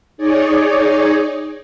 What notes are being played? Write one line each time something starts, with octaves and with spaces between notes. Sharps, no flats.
D#4 G#4 C#5 D5